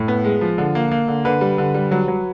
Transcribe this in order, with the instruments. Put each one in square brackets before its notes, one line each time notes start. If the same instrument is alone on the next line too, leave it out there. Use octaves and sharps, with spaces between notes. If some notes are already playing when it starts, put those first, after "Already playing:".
Already playing: [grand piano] A2
B3
G#3
F3
D3
A#3
A#3
D3
D3 B4
G3
D3
G3
F#3
F#3